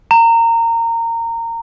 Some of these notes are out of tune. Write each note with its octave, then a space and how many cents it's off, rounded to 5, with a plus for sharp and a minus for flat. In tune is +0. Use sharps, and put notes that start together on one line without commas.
A#5 -20